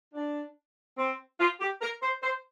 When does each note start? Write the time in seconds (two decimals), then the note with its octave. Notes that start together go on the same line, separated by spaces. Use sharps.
0.14 D4
0.98 C4
1.39 F4
1.60 G4
1.81 A#4
2.02 C5
2.23 C5